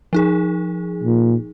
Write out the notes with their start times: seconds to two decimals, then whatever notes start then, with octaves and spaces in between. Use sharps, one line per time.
0.13 F3 D#4 G#4
1.03 A#2